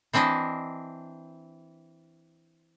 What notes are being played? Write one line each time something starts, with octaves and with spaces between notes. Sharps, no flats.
E3 C4 D4 E4 D#5